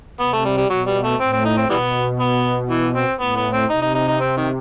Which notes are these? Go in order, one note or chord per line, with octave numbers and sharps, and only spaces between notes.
C3 B3
A3
G3
G3
B2 F#3
G3
A3
A2 C4
C4
D#4
C4
B2 E3 G3 B3
B3
E3
C4
A2 B3
B3
C4
C3 D#4
D#4
D#4
D#4
C4
D#3